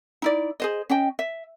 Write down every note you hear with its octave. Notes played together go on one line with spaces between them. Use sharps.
D#4 E4 D5
G#4 C5 D#5
C#4 D#5 G5
E5